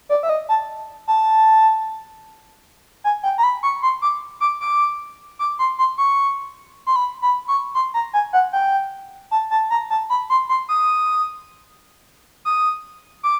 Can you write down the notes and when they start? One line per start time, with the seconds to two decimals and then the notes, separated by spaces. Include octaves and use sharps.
0.09 D5
0.23 E5
0.29 D#5
0.49 A5
1.08 A5
3.04 G#5
3.23 G5
3.38 A#5
3.43 B5
3.63 C#6
3.83 C6
4.02 D6
4.40 D6
4.61 D6
5.39 D6
5.59 C6
5.79 C6
5.98 C#6
6.86 C6
6.96 B5
7.22 B5
7.48 C#6
7.74 C6
7.94 A#5
8.13 G#5
8.33 F#5
8.53 G5
9.31 A5
9.51 A5
9.70 A#5
9.90 A5
10.10 B5
10.30 C6
10.49 C6
10.69 D#6
12.45 D#6
13.23 D6